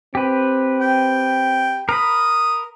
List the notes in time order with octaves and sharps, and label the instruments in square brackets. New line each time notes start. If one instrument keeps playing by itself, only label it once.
[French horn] C4 [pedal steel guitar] G4 B4
[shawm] G5
[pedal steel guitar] A#4 B5 [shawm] D#6